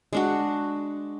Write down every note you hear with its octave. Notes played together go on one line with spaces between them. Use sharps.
G#3 D4 F#4